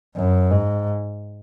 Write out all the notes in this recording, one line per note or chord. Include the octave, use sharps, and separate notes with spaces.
F#2
G#2